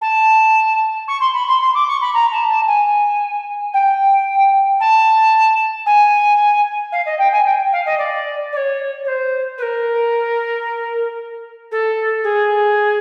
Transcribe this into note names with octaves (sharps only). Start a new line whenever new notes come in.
A5
C#6
C6
B5
C6
C6
D6
C#6
B5
A#5
A5
A5
G#5
G5
A5
G#5
F5
D#5
G5
G#5
G5
F5
D#5
D5
D5
C#5
C#5
C5
B4
A#4
A4
G#4